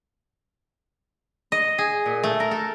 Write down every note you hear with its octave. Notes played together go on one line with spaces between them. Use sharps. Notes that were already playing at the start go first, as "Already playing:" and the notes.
D#5
G#4
A#2
A3
A#4
A4